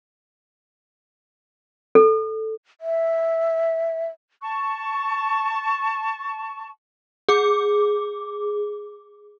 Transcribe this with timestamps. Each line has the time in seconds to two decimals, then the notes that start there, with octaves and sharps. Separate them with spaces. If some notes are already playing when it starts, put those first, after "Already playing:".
1.95 A4
2.81 E5
4.42 A5 C#6
7.29 G#4 D6